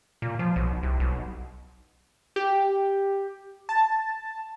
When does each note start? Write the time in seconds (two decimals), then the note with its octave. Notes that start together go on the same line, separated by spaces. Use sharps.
0.22 A#2
0.39 F3
0.56 B1
0.83 C2
1.00 B1
2.36 G4
3.69 A5